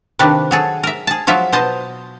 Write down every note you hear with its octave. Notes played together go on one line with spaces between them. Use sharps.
C3 D#3 A#3 D4 B4
F#3 G#4 A4
A#4 E5
G#4 A5
F3 F#3 F4 E5
B2 C5 D#5 A5